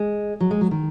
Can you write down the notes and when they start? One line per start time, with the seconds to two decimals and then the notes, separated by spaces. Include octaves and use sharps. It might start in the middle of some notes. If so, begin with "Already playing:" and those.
Already playing: G#3
0.40 F#3
0.51 G#3
0.61 F#3
0.71 D#3